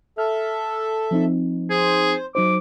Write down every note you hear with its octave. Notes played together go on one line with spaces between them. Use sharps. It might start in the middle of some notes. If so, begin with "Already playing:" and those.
A4 E5 F6
F3 C4 D#4
G#4 C5
F#3 D#4 C5 D6